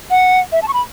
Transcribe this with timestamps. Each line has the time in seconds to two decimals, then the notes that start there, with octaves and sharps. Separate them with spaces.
0.11 F#5
0.52 E5
0.62 A5
0.68 C#6
0.73 B5